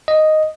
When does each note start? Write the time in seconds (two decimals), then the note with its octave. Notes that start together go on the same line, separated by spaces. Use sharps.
0.08 D#5